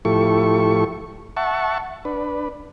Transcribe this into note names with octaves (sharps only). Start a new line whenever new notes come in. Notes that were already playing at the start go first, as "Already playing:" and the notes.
A2 F3 E4 G4 A4 C#6
E5 F#5 A5 C#6
D4 B4